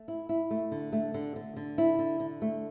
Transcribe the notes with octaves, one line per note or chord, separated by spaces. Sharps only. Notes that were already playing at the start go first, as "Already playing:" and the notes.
Already playing: A3
E4
E4
A3
D3
A3
D3
D3
D3
E4
D3
D3
A3